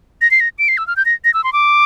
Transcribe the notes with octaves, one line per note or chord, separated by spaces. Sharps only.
A#6
C7
A#6
D7
C7
E6
F6
G6
A#6
A#6
E6
C6
D6